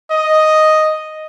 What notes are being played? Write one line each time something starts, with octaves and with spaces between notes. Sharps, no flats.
D#5